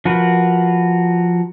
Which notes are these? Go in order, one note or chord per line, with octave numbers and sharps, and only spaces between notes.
F3 F#4 A#4 B4